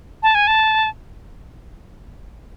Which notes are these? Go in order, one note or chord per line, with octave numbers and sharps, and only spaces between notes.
A5
G#5
A5